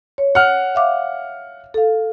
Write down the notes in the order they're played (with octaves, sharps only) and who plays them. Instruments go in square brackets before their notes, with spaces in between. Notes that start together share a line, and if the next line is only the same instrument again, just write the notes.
[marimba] C#5
[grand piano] F#5 F6
[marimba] E5 F5 D6
A4 F5